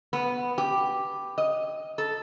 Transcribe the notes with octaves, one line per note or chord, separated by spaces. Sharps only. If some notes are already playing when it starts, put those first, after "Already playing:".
B3
G4
D#5
A4